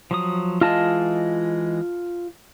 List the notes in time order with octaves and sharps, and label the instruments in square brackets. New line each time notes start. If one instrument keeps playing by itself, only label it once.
[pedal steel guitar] F3 F#3 D#6
[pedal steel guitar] E3 G#3 D#5 [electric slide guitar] F4 A5